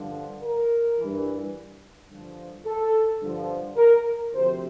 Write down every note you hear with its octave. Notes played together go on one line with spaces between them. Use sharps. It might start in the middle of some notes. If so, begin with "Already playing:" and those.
Already playing: G2 D3 F3
A#4
G2 E3
G2 D3 F3
A4
G2 D3 F3
A#4
D2 C3 F3 C5